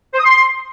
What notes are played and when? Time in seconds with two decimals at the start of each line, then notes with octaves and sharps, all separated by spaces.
0.13 C5
0.19 D#6
0.24 C6